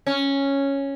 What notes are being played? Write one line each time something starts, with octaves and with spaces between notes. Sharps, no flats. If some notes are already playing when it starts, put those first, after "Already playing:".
C#4